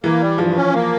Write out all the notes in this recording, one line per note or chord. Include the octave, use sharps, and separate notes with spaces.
E3 A#3
G3
G2 F3
C#4
A#3